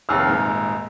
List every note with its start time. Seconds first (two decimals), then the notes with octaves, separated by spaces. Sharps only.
0.09 F1 D#2 E6 F6
0.28 D#1 G#2